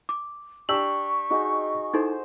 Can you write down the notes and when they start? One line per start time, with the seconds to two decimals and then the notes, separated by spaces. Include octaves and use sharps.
0.09 D6
0.69 D4 G4 C#6 E6 F#7
1.30 D#4 F#4 G#4
1.94 D#4 E4 A4 C5